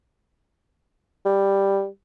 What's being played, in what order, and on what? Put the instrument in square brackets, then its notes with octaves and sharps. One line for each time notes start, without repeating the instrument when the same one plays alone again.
[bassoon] G3